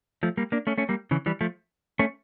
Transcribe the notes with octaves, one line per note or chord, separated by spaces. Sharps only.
F3 A3
G3 A#3
A#3 D4
A3 C#4
A3 C#4
G3 A#3
C#3 E3
E3 G3
F3 A3
A3 C#4